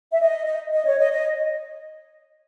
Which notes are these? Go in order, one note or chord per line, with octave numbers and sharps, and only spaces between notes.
E5
D#5
D#5
D#5
C#5
D#5
D#5